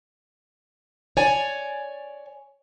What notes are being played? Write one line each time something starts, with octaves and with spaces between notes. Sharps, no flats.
C#5 D5 G#5